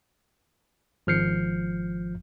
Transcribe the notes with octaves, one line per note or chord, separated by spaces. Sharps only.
G#1 F3 F6 G6 C7 C#7